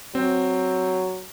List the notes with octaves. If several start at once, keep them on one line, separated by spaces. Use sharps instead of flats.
F#3 C4